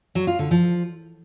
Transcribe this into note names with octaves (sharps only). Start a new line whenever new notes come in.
F#3
F4
D3
F3